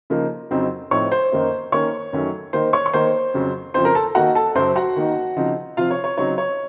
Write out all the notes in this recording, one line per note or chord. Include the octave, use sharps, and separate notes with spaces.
C#3 F3 A#3 D#4
F2 C#3 F#3 C4 D#4
A2 F3 A3 C4 D#4 C#5 C#6
C5 C6
F#2 D#3 A#3 D#4
D#3 A#3 C#4 C#5 C#6
F#2 D#3 F#3 A3 C#4
D#3 A#3 D#4 C5 C6
C#5 C#6
C#6
D#3 A#3 D#4 C5 C6
F2 C#3 F#3
F2 C#3 F3 C5 C6
A#4 A#5
A4 A5
D#3 A#3 D#4 F#4 F#5
A4 A5
F#2 C#3 F#3 C5 C6
F#4 F#5
D#3 A#3 D#4
C#3 F3 C4 D#4
C3 F3 C4 F4 F5
C#5
C#5
C#3 F#3 C4 D#4 C#5
C#5